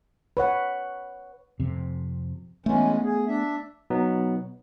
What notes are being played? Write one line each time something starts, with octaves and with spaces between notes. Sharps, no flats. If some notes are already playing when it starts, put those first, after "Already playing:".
B4 C#5 F#5
F2 C3
E3 G#3 A3 B3 C#4
G#4
D4 E5
B2 F#3 B3 D#4